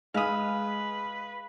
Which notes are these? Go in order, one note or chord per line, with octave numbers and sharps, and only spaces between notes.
G#3 B4 F5 D#6